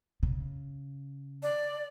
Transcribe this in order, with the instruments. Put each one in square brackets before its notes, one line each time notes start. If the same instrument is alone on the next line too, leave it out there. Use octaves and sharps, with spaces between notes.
[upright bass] C#3
[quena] D5